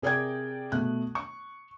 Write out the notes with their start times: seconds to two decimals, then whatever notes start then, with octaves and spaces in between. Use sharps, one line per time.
0.02 C3 G#4 A#4 D5 G5 G#6
0.72 B2 A3 F#6
1.15 C#6